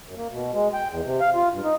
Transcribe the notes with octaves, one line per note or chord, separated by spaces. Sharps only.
F#2
A#3
B2
G#3
G5
E2
C3
F5
F4
G2
D#4